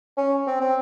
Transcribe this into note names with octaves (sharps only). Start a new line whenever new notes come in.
C#4
C4
C4